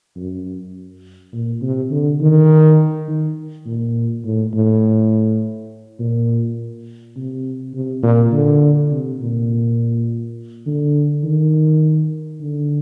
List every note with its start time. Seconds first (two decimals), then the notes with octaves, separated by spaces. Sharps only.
0.16 F#2
1.33 A#2
1.62 C3
1.91 D3
2.21 D#3
3.08 D#3
3.66 A#2
4.25 A2
4.54 A2
6.00 A#2
7.16 C3
7.74 C3
8.03 A#2
8.33 D3
8.91 C3
9.20 A#2
10.66 D3
11.24 D#3
12.41 D3